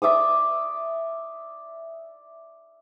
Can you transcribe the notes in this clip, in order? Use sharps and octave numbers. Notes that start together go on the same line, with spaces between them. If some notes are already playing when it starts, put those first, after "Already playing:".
D5 E5 D6 D#6